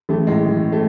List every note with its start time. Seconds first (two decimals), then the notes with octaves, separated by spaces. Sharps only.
0.09 A1 A3
0.27 A2 G#3
0.46 A1
0.72 A3